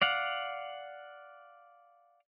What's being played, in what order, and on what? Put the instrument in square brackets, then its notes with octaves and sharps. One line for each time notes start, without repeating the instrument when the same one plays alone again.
[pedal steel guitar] D5 F5 F#5